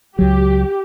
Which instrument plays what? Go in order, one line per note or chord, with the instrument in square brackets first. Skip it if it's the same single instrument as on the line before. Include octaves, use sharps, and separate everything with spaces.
[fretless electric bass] C#2 F#3 [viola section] G4